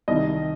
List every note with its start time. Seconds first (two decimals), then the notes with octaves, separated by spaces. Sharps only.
0.08 C2 C3 D#3 D#5